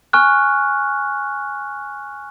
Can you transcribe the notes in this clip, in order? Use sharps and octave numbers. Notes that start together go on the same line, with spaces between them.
G#5 C#6 F6 F#6